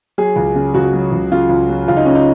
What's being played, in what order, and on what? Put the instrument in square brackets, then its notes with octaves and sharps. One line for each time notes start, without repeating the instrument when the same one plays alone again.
[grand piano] F#3 G#4
C#2
C#3
C#2 F#4
F#3
C#2
C#3 F4
C#2
F#3
C#2 F4
D#4
C#3 C#4
D#4